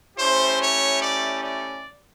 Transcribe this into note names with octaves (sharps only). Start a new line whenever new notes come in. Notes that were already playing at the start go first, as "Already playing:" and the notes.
A3 C#4 E4 G4 C5
C#5
D5
D5